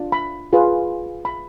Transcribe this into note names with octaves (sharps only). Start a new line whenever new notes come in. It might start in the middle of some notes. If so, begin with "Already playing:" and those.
Already playing: D4 F4
B5
F4 G#4 B4
B5